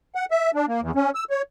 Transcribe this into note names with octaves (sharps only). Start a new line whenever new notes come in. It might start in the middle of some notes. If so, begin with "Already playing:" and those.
F#5
E5
D4
A#3
E2
C#4
E6
C#5